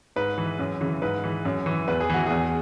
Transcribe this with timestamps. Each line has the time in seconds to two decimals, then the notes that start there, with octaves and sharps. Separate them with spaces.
0.16 G#2 B4
0.38 E3
0.59 F#2
0.81 C#3 E3
1.02 G#2 B4
1.24 E3
1.45 F#2
1.66 E3
1.88 E2 B4
2.01 G#4
2.10 E3 F#4
2.27 E2 G#4